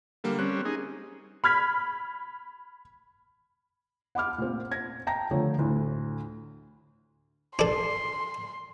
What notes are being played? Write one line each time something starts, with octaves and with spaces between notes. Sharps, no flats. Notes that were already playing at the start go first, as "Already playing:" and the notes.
D3 G3 A#3
G3 C4 C#4 F#6
D#4 G#4
B5 F6 G#6 B6
F#5 B5 D6 F6
A#2 C4
G#6 A#6
G5 A5 A#5 A#6
D3 F3 A3 C#5
D2 A2
D4 A4 C6